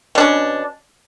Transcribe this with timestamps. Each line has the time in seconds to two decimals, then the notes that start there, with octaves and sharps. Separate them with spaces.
0.15 B2
0.18 D4
0.20 C#4